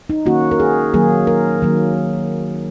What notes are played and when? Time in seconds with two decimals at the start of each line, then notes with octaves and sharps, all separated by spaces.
0.10 D#4
0.26 D#3 A#3 C#4 F#4
0.51 A#4
0.60 G#4
0.94 D#3 F#3 A#3 G#4
1.27 A#4
1.62 D#3 F#3 A#3